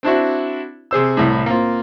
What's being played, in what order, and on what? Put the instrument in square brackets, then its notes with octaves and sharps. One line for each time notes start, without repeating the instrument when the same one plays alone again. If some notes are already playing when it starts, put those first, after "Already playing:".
[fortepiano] C4 D4 E4 F#4
C3 G#4 C5 E6
C2 A2
A#3 C4 F4